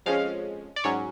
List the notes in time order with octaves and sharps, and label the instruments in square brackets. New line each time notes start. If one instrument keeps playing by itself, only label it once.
[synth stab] F2 F3 G#3 C#4 F5
D5
G#2 F#3 C#4 C#5